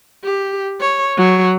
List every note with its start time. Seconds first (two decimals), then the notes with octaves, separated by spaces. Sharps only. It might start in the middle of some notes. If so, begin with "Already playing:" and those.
0.24 G4
0.80 C#5
1.17 F#3